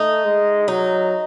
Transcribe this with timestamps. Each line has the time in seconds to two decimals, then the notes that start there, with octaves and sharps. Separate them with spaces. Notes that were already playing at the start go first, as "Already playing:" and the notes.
Already playing: A3 D#4
0.25 G#3
0.68 F#3 D#4